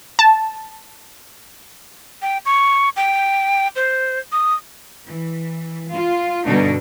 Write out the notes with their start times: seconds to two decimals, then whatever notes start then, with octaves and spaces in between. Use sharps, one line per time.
0.19 A5
2.22 G5
2.46 C#6
2.96 G5
3.76 C5
4.32 D#6
5.05 E3
5.90 F4
6.46 G2 B2 D3 D4 D#4